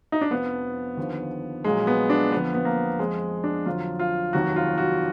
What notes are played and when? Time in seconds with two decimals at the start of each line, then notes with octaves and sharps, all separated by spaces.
0.12 D#4
0.21 D4
0.30 F1 F2 F3 B3
0.97 D#2 D3 F3
1.64 A#1 A#2 F#3 G#3
1.87 B3
2.10 D4
2.32 F2 D3 F3 B3
2.54 B3
2.65 A#3
2.99 F2 F3 G#3
3.44 D4
3.66 F2 D3 F#3 F4
3.99 F4
4.33 F1 D#2 D#3 F#3 F#4
4.56 F4
4.78 F#4